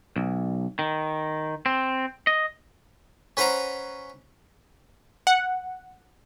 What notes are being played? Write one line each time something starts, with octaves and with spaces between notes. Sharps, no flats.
B1
D#3
C4
D#5
C#4 B4 C5 F#5 A#5
F#5